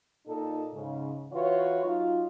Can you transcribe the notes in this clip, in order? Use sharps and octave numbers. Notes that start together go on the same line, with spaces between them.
A#2 D#4 A4
G#2 C#3
E3 F4 F#4 B4 C#5
F#3 D#4 F4